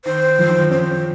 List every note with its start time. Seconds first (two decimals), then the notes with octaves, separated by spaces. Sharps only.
0.05 D#3 C5
0.39 F3
0.49 D#3
0.59 F3
0.71 C#4 C5